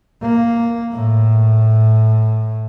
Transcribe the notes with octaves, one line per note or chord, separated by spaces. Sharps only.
A#3
A2